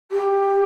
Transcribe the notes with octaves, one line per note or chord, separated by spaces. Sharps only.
G4